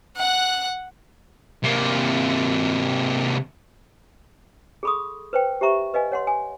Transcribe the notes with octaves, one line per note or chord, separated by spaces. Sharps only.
F#5 F#6
C3 A#3
G#4 A4 B5 C#6 D#6
B4 C5 G5
G4 C5 E5 A#5 C#6
B4 D#5 F5 G#5
C#5 F#5 C6
G#5